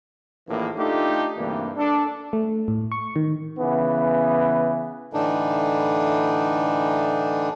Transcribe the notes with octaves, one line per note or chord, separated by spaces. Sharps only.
A#1 A2 D#3 E3 A#3
A3 D4 D#4 F4 G4 A4
D2 G2 C3 E3 A#3
D4 A4
A3
A2
C#6
D#3
C#3 E3 B3
A2 D3 E3 D4 D#4